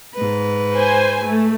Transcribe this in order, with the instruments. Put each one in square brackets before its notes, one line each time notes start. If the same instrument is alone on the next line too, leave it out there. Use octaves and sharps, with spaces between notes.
[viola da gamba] G#2 B4
[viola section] C5 G#5
A3